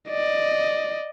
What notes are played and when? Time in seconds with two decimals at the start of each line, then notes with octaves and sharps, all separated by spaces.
0.10 D5 D#5